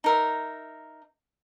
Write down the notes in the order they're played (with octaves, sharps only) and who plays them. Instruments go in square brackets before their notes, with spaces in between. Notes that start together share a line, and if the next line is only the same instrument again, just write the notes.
[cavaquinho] D#4 A#4 E5